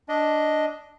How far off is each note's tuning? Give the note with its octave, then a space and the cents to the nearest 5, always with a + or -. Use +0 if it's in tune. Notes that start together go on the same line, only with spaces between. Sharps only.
D4 +0 D#5 +0